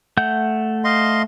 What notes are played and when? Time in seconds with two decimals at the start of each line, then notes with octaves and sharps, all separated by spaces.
0.17 A3 F#5 G6
0.84 D#5 F5 C6